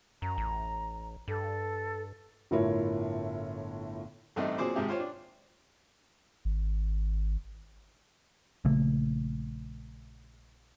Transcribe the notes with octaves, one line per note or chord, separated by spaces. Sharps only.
F#2 A#5
A1
G2 A4
G1 A2 E4 F4 A#4 C#5
A1 G2 A3 C4 D#4 E5
A#2 F#3 C4 G#4 C5 D6
G#1 G#2 C3 G4 G#4 E5
F4 C5 C#5 G5
D4
G#1
A#1 C#3 A3 A#3